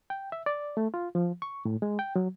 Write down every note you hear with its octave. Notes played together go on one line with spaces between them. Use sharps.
G5
E5
D5
A3
F4
F3
C#6
A2
G#3
G5
F#3